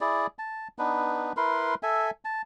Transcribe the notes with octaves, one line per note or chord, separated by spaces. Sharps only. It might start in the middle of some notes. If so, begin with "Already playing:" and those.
E4 G#4 D5
A5
B3 D4 D#4 B4
E4 A#4 B4 C6
A4 E5 G#5
A5